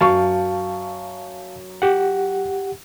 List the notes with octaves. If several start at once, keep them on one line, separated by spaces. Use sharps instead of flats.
F#2 F#3 F5 A5 C#6
G4 F#5